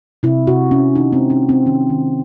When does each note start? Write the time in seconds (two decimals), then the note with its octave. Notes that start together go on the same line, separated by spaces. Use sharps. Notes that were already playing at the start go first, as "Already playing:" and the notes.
0.23 C3 E4
0.47 C3 F#4
0.71 C3 C#4
0.95 D#3 D#4
1.13 C4
1.18 G#3
1.30 C#4
1.42 G#3
1.49 C4
1.66 D#3 C#4
1.90 D#3